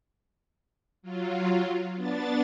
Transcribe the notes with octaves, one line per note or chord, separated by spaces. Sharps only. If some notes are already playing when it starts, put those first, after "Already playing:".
F#3 F4
B3 D4 A6